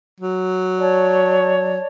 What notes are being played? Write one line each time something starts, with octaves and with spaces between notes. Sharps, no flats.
F#3
C#5 D5 A5